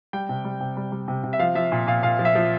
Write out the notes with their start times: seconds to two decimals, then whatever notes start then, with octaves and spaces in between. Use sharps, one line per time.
0.13 G3 G5
0.29 C3
0.45 G3
0.60 C3
0.77 G3
0.92 G3
1.08 C3
1.24 C3
1.33 E5
1.39 F3 F5
1.55 F3 E5
1.72 A#2
1.87 A#2 F5
2.03 A#2 F5
2.19 F3
2.25 E5
2.35 F3